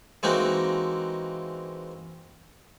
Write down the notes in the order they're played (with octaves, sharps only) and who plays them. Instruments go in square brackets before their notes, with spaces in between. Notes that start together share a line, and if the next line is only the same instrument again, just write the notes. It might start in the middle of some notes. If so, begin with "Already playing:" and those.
[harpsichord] E3 G#3 A#3 C4 D#4 F#4